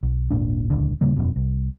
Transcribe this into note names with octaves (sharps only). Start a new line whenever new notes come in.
B1
D#1 G#1 A#2 D4
D#1 C#2 D3
D#1 C#3 G3 A#3
E1 F#2 B2
C2